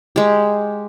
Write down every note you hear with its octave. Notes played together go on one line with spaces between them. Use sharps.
G#3 G4